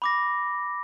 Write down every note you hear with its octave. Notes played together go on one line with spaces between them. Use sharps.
B5 D6 A#6